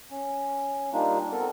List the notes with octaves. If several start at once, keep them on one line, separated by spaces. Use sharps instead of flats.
C#4
G3 A#3 D4 D#4 F4
B3 C4 A4 A#4